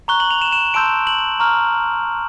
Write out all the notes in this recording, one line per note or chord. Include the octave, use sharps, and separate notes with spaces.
A#5 C#6 F#6 G7
F#7
F7
E7
E7
A5 C6 E6 G6 D7
F#7
A#5 C#6 F6